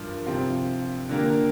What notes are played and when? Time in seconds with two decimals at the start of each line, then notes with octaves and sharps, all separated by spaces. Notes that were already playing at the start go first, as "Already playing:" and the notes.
Already playing: G2 F3 D4 A#4
0.26 C3 F3 C4 F4
1.09 D3 A#3 G4 A#4